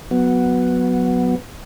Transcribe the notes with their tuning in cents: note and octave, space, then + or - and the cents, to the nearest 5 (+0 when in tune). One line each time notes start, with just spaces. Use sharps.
F#3 -20 B3 +0 F#4 +0